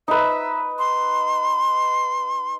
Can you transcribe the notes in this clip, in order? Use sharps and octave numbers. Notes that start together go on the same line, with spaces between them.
D#4 B4 E5
C6